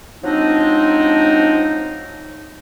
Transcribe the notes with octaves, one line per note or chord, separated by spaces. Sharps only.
F3 F#3 G#3 C4 D4 D#4